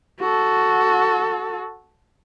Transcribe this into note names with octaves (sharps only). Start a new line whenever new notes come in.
F#4 A4